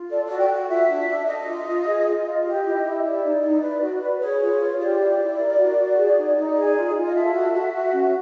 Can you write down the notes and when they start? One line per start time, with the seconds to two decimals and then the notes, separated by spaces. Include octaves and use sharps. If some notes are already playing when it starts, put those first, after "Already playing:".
Already playing: F4
0.10 A4 D5
0.25 F#4 D5
0.39 G5
0.49 F#4 F#5
0.69 F4 E5
0.88 D4
1.09 D4
1.27 A4 D#5
1.46 F4
1.67 F4
1.87 G#4
2.06 F4
2.25 F4
2.45 G4 D#5
2.64 E4
2.83 E4
3.03 G4 D5
3.23 D#4
3.43 D#4
3.62 B4
3.81 F#4
4.02 B4
4.21 G#4 C#5
4.40 F4
4.60 F4
4.79 G4 D5
5.00 E4
5.19 E4
5.39 A#4
5.57 F#4
5.77 F#4
5.97 G#4
6.16 D#4
6.36 D#4
6.55 G#4
6.76 F4
6.95 F4
7.05 D#5
7.14 A4 E5
7.34 F#4
7.53 F#4
7.73 F#4
7.93 C#4